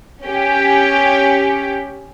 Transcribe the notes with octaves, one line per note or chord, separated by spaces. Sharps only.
C#4 G4